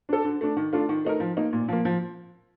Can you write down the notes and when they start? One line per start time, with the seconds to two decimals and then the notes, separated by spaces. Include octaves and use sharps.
0.09 D4 A4
0.24 D3
0.41 A3 D4
0.57 D#3
0.73 A3 D4 F4
0.89 D#3
1.05 A3 D#4 A#4
1.20 F3
1.37 A#3 D#4
1.53 A#2
1.68 F3 A#3
1.85 F3